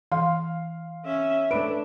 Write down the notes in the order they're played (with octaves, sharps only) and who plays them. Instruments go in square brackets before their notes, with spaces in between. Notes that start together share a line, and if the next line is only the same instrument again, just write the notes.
[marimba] E3 [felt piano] F5 C6
[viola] C#4 E5
[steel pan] A3 B4 [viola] D4 [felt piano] D7